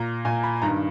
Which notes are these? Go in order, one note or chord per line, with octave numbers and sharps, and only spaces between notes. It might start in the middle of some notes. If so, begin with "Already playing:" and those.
Already playing: A#2 A#5
A#2 G#5
B5
G2 D#3 A#5